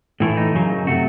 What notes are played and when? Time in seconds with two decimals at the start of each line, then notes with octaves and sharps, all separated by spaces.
0.20 A2 E3 A3 E4
0.37 D#4
0.54 F#2 C#3 F#3
0.86 C3 F#3 A3 F#4